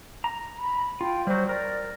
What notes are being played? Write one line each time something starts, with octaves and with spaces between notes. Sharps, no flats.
A#5
B5
F4 G5
F#3 G3 C5
A#4 D5